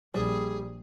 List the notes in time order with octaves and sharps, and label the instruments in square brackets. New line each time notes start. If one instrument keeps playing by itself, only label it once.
[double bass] A#1 [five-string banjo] G3 [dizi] G#4